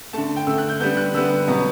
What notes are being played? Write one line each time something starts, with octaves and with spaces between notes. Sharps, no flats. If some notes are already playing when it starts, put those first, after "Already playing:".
D3 A3 A5
G5
D3 A3 E6
F#6
G6
D3 G3 B3 G6
F#6
D3 G3 B3 E6
B2 F#3 B3